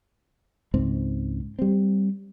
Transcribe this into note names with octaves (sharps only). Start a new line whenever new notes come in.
C#2 G#2 C4
G3 C4